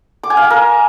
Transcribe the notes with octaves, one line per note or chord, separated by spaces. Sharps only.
D6
G#5
F5
G#5
A#4